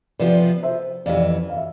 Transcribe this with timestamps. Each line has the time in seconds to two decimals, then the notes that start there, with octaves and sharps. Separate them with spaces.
0.19 C3 F3 B3 F4 B4 D5
0.63 C5 E5
1.06 F2 C3 E3 D5 F5
1.50 F5
1.57 E5